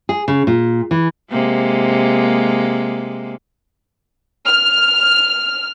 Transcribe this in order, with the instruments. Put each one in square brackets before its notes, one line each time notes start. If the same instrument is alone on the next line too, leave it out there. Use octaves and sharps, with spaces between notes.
[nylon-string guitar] G#4
C#3
A#2
E3
[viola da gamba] C3 G#3 A#3
[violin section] F6